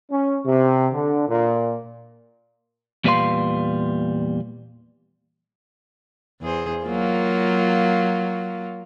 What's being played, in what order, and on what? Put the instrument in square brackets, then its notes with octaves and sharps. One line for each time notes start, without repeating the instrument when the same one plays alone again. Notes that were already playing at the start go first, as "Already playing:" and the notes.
[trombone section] C#4
C3
D3
A#2
[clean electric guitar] E2 A#2 G3 B4 F5 C6
[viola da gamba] E2 G#4 C5
F#3 A#3 F4